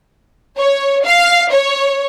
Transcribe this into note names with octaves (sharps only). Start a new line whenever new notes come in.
C#5
F5
C#5